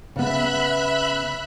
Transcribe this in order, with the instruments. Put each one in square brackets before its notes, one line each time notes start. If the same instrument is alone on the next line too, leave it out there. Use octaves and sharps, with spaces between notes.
[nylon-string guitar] C#3 B3 [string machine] E5 B5 F#6